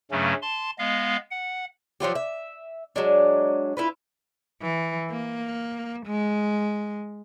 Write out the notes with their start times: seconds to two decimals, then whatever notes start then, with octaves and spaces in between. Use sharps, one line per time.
0.11 G2 C#3 F#3 A3 C#4
0.42 A5 C6
0.79 G#3 B3 D#5 F5
1.31 F#5
2.00 F3 F#3 F4 G4
2.15 E5
2.96 F#3 G#3 D4
3.77 E4 F4 B4
4.62 E3
5.11 A#3
6.06 G#3